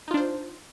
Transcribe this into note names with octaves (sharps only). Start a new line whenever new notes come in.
D4 D#4 F4 C5